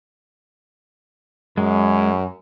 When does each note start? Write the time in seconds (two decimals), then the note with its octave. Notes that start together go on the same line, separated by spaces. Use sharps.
1.57 F#2 G#3